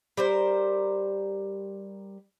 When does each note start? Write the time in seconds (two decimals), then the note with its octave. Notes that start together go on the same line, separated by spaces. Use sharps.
0.17 G3 A#4 C5